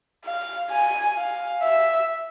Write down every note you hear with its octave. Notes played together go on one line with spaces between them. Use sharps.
F5
G#5
F5
E5